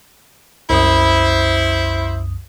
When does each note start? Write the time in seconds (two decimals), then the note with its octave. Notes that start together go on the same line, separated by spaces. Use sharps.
0.70 C2 F#2 E4 C5 D#6